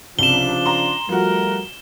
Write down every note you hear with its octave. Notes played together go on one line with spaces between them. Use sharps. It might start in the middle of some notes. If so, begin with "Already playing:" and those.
C2 C#3 F3 D4 E7 G7
A#5 C6
F3 G3 A3 F#4 A#4